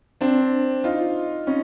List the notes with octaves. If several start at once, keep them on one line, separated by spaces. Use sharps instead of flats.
C4 D4
D#4 F4
C#4 D#4